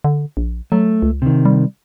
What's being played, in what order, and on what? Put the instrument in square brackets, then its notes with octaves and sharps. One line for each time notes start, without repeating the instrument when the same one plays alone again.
[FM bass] D3
A#1
[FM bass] F#3 [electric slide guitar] A3
[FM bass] C#2
[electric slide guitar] C3 D#3
[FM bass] G3